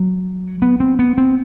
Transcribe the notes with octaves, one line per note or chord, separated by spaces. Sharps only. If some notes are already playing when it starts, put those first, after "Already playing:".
Already playing: F#3
B3
C4
B3
C4